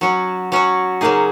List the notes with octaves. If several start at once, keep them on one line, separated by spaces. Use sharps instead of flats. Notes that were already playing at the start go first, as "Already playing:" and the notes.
F#3 C#4 F#4
F#3 C#4 F#4
C#3 F#3 A#3 D#4 G#4